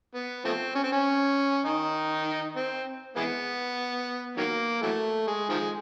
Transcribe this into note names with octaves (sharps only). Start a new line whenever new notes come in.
B3
F3 A3 C4
C#4
C4
C#4
D#3 D#4
C4
E3 G#3 B3
D#3 F#3 A#3
E3 F#3 A3
G#3
D#3 F3 G#3